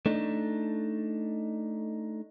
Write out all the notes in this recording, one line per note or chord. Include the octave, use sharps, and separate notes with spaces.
A3 D4 D#4